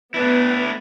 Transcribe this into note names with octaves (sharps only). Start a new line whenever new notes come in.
A3 B3 D4 E4 B4